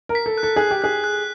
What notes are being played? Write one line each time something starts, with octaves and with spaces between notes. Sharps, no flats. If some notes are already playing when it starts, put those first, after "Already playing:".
A#4
B6
A4
F#6
A4
G#4 F#6
G4
G#4 F#6
F#6